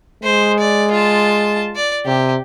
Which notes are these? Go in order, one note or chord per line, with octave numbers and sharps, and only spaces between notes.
G#3 C5
D5
F4 A5
D5
C3 G4